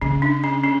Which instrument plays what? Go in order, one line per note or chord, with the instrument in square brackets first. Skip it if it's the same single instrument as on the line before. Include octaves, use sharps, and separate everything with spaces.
[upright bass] C#3 [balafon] C#4
[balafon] D4
C#4
C#4